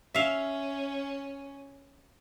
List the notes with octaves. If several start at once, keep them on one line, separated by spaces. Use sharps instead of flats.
C#4 E5 F5